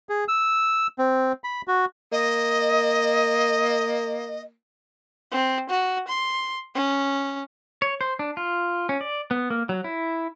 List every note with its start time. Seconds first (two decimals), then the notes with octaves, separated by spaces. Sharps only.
0.09 G#4
0.28 E6
0.98 C4
1.44 B5
1.68 F#4
2.12 A#3 D#5
5.31 C4
5.70 F#4
6.08 C6
6.75 C#4
7.82 C#5
8.01 C5
8.19 D4
8.37 F4
8.89 C#4
9.01 D5
9.31 B3
9.50 A#3
9.69 F#3
9.84 E4